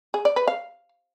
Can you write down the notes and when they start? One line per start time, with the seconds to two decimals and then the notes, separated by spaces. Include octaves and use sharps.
0.14 G#4
0.25 D5
0.36 B4
0.48 F5